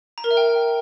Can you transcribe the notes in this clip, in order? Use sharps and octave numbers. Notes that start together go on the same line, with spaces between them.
A#5
A#4
E5
G5